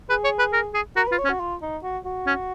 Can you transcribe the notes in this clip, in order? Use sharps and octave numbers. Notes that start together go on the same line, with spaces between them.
G#4 B4
C#5
B4
A#4
G#4
F#4 A#4
B4
F4
C#5
C#4
F#4
F4
D#4
F#4
F#4
C#4